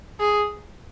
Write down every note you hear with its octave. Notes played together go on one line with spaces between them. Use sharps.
G#4